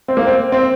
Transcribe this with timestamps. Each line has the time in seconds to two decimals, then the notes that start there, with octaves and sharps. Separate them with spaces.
0.08 C4
0.17 A#3
0.27 C4
0.52 C4